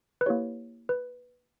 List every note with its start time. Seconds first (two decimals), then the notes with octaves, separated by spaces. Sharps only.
0.21 B4
0.26 A#3 E4 G4 C#5
0.89 B4